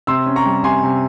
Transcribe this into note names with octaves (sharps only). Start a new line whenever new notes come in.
C3 C6 E6
C#4
A#5 C#6
G3
C3 G#5 C6
C3